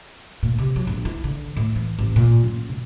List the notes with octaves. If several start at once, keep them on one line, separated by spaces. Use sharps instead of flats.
A#2
C3
F#3
A#1
E4
D3
A2
E3
A1
A#2
F#2
B2